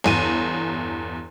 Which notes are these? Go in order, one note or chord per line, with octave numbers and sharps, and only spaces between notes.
G1 E2 D#7